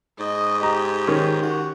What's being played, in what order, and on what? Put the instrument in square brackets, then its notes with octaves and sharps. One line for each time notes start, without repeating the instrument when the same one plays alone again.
[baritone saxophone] G#2 [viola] D#5
[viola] G4 [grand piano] A#5
[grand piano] D#3 C#4
[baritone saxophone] F#4